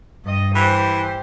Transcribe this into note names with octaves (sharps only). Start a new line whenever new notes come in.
G2 D#5
E3 G4 C5